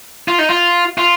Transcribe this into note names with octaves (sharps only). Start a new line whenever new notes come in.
F4
D#4
F4
F4